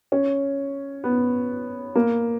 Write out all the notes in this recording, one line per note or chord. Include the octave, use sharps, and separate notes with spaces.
C#4
B3
A#3